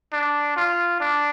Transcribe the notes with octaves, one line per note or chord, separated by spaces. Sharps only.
D4
F4
D4